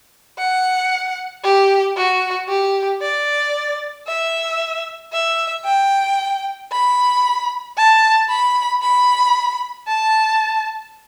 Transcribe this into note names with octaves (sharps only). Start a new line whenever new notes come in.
F#5
G4
F#4
G4
D5
E5
E5
G5
B5
A5
B5
B5
A5